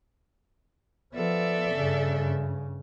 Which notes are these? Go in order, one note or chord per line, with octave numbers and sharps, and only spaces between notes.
F3 B3 A4 D5 E5
G2 C#3